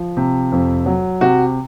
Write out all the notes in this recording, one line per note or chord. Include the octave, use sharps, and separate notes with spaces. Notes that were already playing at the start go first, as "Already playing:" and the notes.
Already playing: F3
C3
F2
F#3
C3 F#4